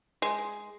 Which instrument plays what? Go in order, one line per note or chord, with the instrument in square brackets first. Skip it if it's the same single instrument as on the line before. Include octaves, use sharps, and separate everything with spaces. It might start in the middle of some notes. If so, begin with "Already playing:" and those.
[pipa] G#3